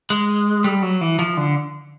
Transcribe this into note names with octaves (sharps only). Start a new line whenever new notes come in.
G#3
G3
F#3
E3
F3
D3